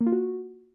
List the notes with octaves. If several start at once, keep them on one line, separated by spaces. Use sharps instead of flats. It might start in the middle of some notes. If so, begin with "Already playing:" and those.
A#3
F4
F#4